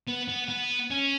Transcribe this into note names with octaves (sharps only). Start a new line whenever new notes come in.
B3
B3
B3
C#4